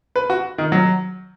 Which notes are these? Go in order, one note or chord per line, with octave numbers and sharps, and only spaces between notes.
B4
F#4
D#3
F#3